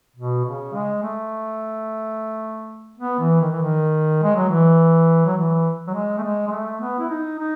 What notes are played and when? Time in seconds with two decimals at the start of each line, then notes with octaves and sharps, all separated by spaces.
0.16 B2
0.45 C#3
0.73 G#3
1.03 A3
2.97 B3
3.19 E3
3.41 D#3
3.52 E3
3.62 D#3
4.23 G#3
4.36 F#3
4.49 E3
5.26 F#3
5.37 E3
5.87 F#3
5.94 G#3
6.18 A3
6.23 G#3
6.47 G#3
6.51 A3
6.81 B3
6.99 E4
7.09 D#4
7.39 D#4